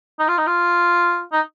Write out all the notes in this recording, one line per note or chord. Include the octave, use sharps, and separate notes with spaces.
D#4
F4
D#4
F4
D#4